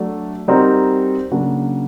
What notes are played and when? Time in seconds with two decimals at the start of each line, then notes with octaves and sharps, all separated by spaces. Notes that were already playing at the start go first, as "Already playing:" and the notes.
Already playing: F#3 A3 D4
0.48 G3 C4 D#4 F#4 A#4
1.31 C#3 F#3 A#3 D4 F#4